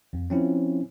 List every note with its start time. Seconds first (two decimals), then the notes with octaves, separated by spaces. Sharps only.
0.13 F2
0.30 F3 C4 C#4 E4